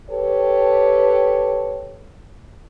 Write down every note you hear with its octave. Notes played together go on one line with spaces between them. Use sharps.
G4 A4 B4 C#5